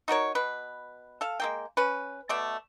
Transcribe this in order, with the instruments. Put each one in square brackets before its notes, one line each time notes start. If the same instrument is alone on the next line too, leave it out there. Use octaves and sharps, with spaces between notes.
[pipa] D#4 F#4 A#4 C#5
B2 B4
A4 F5
G#3 A#3 G5
C#4 B4
B2 A3 D5